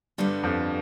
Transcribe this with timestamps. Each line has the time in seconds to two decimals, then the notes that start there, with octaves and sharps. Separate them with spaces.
0.18 G2 D3 G3 B3
0.43 F2